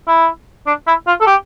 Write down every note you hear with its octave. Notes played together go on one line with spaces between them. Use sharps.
E4
D4
E4
F4
A4
G4